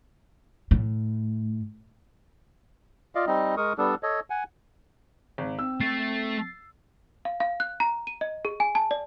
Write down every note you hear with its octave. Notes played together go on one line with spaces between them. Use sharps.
A2
F4 D5 D#5 F5
G3 C4 D#4 D#5
G#3 A#4 C#6 D#6
G3 B3 D4 A4
A4 C#5 D#5
F#5 G#5
G#1
C4 E6
A3 A4 A6 C7
F5
F5
F#6
A#5
D#7
D#5
G#4
G#5
A5
D5